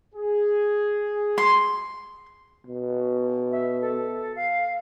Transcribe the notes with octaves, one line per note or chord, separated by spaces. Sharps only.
G#4
C6
B2
E5
A4
F5